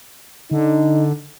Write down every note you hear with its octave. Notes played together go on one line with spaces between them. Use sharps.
D3 D#4